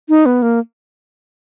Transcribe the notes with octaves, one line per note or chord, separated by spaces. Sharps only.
D#4
B3
A#3